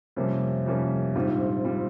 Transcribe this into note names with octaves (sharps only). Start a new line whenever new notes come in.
F2 C3 G3 A#3 C#4
F2 C3 G3 A#3 C#4
A#1 G#2 G3 C4 F4
G3 C4 F4